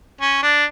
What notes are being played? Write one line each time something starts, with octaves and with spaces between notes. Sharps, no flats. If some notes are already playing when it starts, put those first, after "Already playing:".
C#4
D4